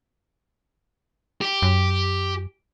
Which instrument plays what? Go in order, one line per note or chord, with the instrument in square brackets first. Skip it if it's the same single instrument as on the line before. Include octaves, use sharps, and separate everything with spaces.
[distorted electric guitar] G4
[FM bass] F#2